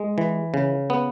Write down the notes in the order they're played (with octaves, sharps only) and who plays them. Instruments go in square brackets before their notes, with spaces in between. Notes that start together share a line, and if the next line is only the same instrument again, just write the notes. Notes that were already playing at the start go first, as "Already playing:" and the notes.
Already playing: [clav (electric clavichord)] G#3
E3
C#3
B3